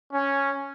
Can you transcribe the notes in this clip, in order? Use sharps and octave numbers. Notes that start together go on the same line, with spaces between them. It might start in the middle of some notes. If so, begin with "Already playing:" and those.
C#4